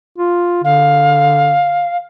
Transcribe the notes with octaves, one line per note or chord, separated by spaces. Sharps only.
F4
D3 F5